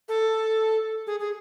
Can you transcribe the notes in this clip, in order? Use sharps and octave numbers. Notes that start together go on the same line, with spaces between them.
A4
G#4
G#4